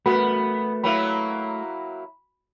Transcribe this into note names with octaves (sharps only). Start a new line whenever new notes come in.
A3 B3 F#4 A#4 B4 F#5 B5
F#3 A#3 E4 B5